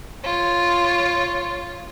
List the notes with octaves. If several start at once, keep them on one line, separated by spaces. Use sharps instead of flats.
F4 C#5